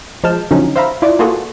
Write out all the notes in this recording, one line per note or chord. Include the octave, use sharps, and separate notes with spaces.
F3 G#3 A5 F6 G6 E7
D3 F3 F#3 C#4 D#4
C5 E5 F5 A#5 B5 E6
E4 F4 D5
A#3 F4 F#4 G#4 A4 B4